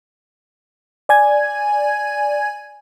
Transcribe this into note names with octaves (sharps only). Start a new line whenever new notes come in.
D5 G#5 G#6